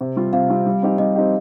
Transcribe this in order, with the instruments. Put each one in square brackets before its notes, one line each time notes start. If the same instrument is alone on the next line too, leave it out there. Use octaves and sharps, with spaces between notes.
[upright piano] C3
G3 C4 F4
[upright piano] C3 [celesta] F5
[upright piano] G3 C4 F4
G3
C4 D#4 G4
[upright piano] G3 [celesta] D#5
[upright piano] C4 D#4 G4